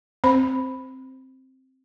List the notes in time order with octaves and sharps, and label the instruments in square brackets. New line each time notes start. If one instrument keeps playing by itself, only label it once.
[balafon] C4 C5 B5